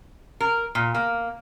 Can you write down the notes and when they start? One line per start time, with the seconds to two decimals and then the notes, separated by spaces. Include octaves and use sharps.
0.40 A#4
0.75 A#2
0.95 A#3